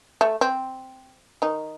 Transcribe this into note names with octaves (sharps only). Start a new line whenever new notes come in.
A3
C4
D#3 D#4